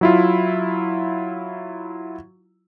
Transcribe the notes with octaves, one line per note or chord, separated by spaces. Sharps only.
F#3 E4 F4